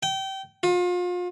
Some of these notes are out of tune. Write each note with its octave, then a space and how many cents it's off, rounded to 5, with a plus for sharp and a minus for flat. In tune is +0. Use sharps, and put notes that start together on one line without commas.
G5 -25
F4 +35